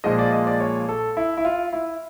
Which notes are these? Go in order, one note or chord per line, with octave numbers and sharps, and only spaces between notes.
A#2 F3 G#3 D#5
D5
D#5
D5
C#5
A4
E4
E4
F4
E4